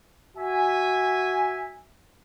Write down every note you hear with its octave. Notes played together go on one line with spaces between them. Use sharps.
F#4 E5 G#5